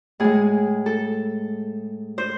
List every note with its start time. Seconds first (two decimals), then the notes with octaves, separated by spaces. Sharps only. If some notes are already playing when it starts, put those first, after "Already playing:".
0.20 A2 G#3 G#4
0.86 A4
2.18 C5